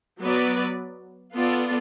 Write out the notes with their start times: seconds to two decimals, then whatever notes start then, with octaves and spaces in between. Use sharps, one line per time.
0.20 F#3 B3 F#4 B4 D5
1.34 B3 F4 A4 D5